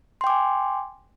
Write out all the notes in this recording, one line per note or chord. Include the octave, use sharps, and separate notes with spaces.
G5 G#5 C6 D6